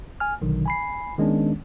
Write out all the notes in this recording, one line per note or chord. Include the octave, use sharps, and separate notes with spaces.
G#5 F6
A#1 B2 D3 D#3 F#3
G#5 B5 C7
D#3 G#3 B3 C#4 D4